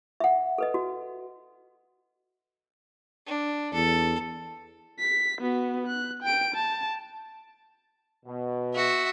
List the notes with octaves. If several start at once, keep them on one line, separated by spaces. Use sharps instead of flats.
E5 F#5
A4 B4 D#5
F#4
D4
E2 A4
B6
B3 F#4
F#6
G5 D7
A5
B2
F#4 E5